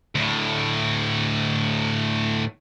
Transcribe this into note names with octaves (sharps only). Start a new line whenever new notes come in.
D2 A2